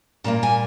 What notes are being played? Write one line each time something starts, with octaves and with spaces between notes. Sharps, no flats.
A#2 G3 A#3 A#5
G#5